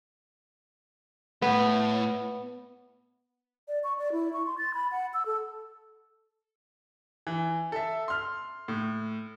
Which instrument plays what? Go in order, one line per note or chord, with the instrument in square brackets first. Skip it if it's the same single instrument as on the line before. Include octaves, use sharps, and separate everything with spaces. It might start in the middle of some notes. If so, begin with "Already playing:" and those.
[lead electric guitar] A2 [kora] B3
[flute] D5
C#6
D5
E4
C#6
C6
A6
B5
F#5
E6
A4
[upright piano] E3
A4 E5
C6 F6
A2